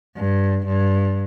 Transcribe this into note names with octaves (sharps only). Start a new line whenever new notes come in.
G2
G2